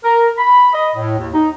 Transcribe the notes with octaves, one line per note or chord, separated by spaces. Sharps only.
A#4
B5
D#5
A2
D#2
D#4